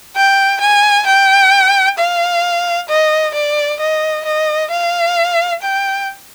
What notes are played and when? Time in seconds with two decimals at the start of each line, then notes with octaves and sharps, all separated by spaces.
0.16 G5
0.61 G#5
1.06 G5
1.98 F5
2.89 D#5
3.35 D5
3.80 D#5
4.25 D#5
4.71 F5
5.62 G5